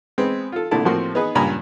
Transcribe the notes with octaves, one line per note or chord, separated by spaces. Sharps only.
G#3 B3 C4
F4 A4
C2 A#2 D3 A3 E4 A5
A2 F3 A#3 C4 F#4 C6
B3 D#4 G#4 B4
C#2 G2 A#2 G#5 A#5 B5